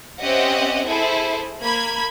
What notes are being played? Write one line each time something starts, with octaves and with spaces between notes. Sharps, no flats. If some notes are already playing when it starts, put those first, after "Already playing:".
C4 C#4 G4 D#5 E5 F#5
E4 G#4 A4 C5
A#3 B5 G#6